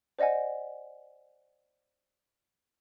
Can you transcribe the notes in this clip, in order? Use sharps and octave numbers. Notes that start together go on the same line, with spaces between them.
C5 D5 D#5 F#5 G#5